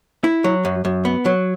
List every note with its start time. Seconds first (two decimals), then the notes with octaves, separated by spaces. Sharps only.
0.24 E4
0.44 F#3
0.65 F#2
0.85 F#2
1.05 B3
1.26 F#3